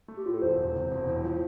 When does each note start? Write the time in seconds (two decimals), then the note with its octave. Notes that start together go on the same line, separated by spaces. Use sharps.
0.08 A3
0.17 G4
0.26 A2 F4
0.34 A4
0.42 E1 C5
0.58 E2
0.75 C3
0.91 E1
1.07 A2
1.24 F3